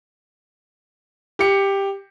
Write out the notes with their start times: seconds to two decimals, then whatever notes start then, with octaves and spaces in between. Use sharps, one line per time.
1.39 G4 C#7